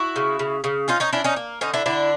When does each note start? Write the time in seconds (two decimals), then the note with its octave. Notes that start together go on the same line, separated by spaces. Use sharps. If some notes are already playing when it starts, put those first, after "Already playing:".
Already playing: E4 F#4
0.16 C#3
0.39 C#3
0.64 C#3
0.88 C#4 D#4 F4
1.00 C#4 D#4
1.13 C#4 D4 E4
1.24 C#4 D#4
1.36 A#3
1.61 D3 C#4 D#4
1.74 D4 E4
1.86 D3 D4 E4